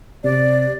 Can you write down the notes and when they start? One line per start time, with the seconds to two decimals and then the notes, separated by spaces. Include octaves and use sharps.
0.24 C3 D5